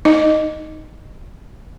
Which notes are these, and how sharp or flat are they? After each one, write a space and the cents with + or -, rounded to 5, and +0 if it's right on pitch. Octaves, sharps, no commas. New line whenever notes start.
D#4 +0 D#5 -10